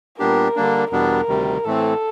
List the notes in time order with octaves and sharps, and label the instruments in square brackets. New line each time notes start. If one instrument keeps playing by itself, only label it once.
[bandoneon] A#2 G3 B3 D4 G4 [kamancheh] A#4
[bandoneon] D3 G3 A#3 D4
[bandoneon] E2 B2 G3 B3 D4 [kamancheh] A#4
[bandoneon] D2 C3 D#3 G3
[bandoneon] A2 E3 A3 C4 [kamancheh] A4